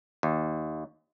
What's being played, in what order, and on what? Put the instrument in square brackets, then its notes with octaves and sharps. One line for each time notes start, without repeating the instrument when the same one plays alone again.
[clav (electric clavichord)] D#2